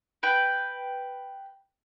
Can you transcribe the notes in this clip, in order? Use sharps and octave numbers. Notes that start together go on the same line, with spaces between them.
B4 G5